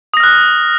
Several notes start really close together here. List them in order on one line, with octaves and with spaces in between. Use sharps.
D#6 A#6 F6 F#6